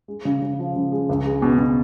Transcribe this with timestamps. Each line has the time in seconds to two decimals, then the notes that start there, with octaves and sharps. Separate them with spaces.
0.08 G#3
0.25 C#3
0.42 C#3
0.59 F3
0.76 C#3
0.92 G#3
1.09 C#2
1.25 G#3
1.42 B2
1.59 B2